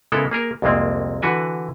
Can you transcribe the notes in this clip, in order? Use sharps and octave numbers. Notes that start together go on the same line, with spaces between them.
C#3 G#3 B3 E4 A4 A#4
A#3 G#4 A#4
C2 F2 A#2 G#3 A#3 C4
D3 E3 F#4 B4 G#5